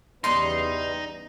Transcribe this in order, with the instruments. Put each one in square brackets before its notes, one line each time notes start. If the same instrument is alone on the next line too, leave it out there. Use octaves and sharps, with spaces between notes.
[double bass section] E2 C#3 B3 [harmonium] G3 [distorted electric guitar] D#4 [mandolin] D#5 C6